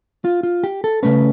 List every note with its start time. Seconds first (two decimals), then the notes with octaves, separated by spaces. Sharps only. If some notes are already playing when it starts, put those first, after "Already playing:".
0.25 F4
0.43 F4
0.64 G4
0.84 A4
1.03 C#3 F3 A3 C#4 B4